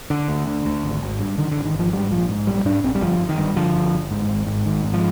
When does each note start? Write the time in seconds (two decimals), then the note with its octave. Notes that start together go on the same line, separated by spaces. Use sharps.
0.10 D3
0.28 D2
0.47 D3
0.66 D2
0.84 G#1
1.02 G#1
1.20 G2
1.38 D3 D#3
1.51 D3
1.57 G#1
1.65 D#3
1.74 G#1 F3
1.93 G#2 G3
2.11 A#1 F3
2.29 G#2
2.47 A#1 G3
2.65 G#2 D4
2.84 A#1 C4
2.95 G3
3.01 G1 F3
3.20 G1
3.29 D#3
3.38 G2
3.56 D3 F3
3.74 G1
3.93 G1
4.11 G#2
4.28 G#1
4.47 G#2
4.66 G#1 D#3
4.84 G#2
4.93 F3